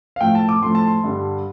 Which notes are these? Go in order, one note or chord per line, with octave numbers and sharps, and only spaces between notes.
F5
A2 F3 A3 G5
A5
D6
A2 F3 A3 C6
A5
C6
G2 D3 G3